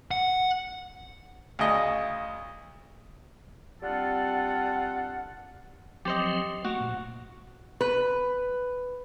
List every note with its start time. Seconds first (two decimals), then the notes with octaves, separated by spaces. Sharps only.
0.11 F#5
1.59 D2 C#3 D#5
3.82 G3 C4 D4 F4 A4 F#5
6.05 F3 F#3 C4 G4 C5 D#5
6.65 A3 A#3 F#4
6.81 A#2
7.81 B4